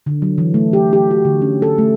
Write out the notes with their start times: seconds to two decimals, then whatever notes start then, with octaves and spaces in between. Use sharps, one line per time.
0.06 D3
0.22 F#3
0.38 E3
0.54 A3
0.73 G4
0.93 G4
1.11 F#4
1.25 D3
1.42 C#4
1.62 A4
1.78 A3